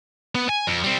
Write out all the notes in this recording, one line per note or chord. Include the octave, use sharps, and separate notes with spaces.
B3
G#5
F2
G3 C4